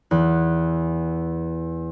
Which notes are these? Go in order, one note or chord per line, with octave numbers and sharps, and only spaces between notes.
E2 F#6